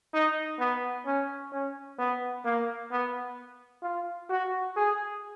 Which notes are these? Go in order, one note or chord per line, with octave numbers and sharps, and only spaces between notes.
D#4
B3
C#4
C#4
B3
A#3
B3
F4
F#4
G#4